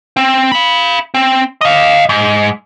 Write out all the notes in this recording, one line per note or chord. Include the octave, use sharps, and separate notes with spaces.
C4
F5 B5
C4
D#5 F5
G#2